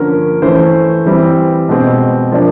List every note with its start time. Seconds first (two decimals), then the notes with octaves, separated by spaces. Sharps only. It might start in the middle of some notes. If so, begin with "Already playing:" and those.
Already playing: D3 F3 A#3 C#4 A#4
0.42 E3 A3 C#4 C5
1.06 E3 G3 C4
1.69 B2 G#3 C4
2.32 F3 A#3 D4